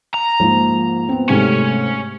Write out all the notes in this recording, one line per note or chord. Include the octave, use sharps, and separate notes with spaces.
A#5
G#2 F3 A#3
B3 C4
G#2 C3 A3 C#4